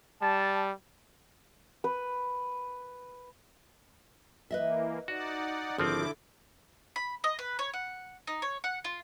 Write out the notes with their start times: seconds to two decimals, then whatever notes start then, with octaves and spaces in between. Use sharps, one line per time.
0.22 G3 A5
1.84 B4
4.51 E3 A#3 B4 D#5 E5
5.08 D#4 F#4 D5 F#5
5.78 G#1 D3 F3 C4 E4 D6
6.96 B5
7.24 D#5
7.39 B4
7.59 C#5
7.74 F#5
8.27 D#4
8.42 C#5
8.64 F#5
8.84 F4